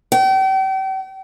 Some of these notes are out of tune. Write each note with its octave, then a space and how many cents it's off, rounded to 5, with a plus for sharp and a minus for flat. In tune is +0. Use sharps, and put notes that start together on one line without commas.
G5 -40